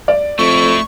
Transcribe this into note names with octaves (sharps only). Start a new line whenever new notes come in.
D5
F2 A3 E4 C#6